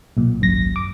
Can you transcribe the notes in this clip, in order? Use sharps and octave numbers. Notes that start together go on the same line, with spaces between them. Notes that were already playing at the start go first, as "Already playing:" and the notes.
B1 A#2
G#1 C#2 F#2 A#6
D6